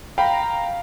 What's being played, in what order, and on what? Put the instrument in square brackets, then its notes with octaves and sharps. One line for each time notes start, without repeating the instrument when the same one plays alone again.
[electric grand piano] F5 B5 [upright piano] G5 [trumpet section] A#5